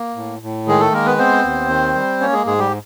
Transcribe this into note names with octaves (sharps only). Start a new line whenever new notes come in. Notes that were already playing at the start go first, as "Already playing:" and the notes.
Already playing: A#3
A2
A2
D#3 G#3 G#4
A3 A4
G#3 A#3 A#4
B3 B4
B3 C4 C5
D#2
D#3
G3
A#3 C#4 C#5
G#3 G#4
G#2 G#3 G#4
G3 G4